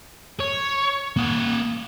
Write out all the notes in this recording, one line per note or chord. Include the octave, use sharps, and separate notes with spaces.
C#5
A#3 F#5